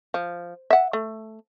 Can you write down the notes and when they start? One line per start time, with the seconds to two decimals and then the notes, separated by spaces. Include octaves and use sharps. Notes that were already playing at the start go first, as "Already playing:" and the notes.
0.14 F3
0.70 E5 F#5
0.93 A3